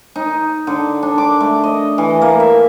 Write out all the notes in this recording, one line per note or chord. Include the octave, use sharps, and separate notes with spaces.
D#4
D3
D4
D6
A3
D#5
E3
A#3
E5